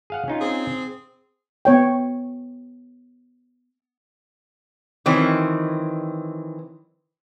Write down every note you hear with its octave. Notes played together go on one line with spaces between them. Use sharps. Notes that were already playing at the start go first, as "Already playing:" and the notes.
G#4 F5 F#5
C#4 D#4 F4
C4 G#4 C5
B3 C#5 G5
D#3 E3 F#3 C4